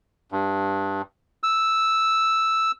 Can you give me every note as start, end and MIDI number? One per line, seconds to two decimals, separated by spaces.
0.32 1.02 43
1.43 2.71 88